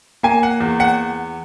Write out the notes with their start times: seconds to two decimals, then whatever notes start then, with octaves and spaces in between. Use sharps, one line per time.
0.23 A#3 G#5
0.43 F#5
0.60 E2
0.80 F#5